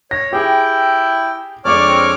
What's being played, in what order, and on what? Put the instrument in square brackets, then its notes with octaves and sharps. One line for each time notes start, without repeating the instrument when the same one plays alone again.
[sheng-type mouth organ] C#5 [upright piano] A#6
[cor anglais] E4 [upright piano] G4 G#4 [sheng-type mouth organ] G5
[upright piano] F2 G#3 D4 [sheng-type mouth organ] C#5 D6 F6 [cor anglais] D5 [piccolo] C#6
[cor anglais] C4